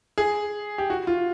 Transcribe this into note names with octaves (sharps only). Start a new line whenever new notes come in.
G#4
G4
F#4
F4